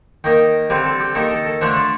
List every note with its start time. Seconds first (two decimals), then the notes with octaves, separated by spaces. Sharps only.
0.24 D#3 A#3 D#4 G5
0.70 D3 G3 C4 F5
0.86 A4
1.00 G4
1.15 D#3 A#3 D#4 A4
1.31 A4
1.46 A4
1.61 D3 A3 D4 F4 C5
1.77 D5